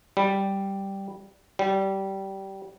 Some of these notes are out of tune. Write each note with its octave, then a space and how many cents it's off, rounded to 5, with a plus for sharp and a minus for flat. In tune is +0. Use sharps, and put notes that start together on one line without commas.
G3 -5
G3 -20